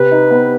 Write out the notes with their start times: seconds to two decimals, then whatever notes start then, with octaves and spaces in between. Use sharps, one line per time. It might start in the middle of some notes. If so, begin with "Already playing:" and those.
Already playing: C3 B4
0.12 D#4
0.31 B3